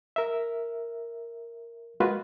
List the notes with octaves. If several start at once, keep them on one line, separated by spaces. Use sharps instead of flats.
A#4 E5
G#3 A#3 F4 F#4 G#4 B4